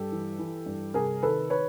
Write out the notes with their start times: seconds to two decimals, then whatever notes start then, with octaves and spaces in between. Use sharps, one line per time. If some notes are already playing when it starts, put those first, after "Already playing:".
Already playing: G2 G4 A4
0.12 E3
0.39 E3
0.66 G2
0.94 C3 G#4 A#4
1.23 D#3 A4 B4
1.50 B4 C#5